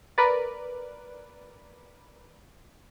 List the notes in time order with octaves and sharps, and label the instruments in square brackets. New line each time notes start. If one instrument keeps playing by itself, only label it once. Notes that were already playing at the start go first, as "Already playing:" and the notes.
[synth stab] A#4 B4 D5